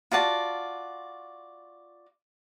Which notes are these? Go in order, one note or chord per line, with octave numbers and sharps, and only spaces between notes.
F4 F#4 D5 A5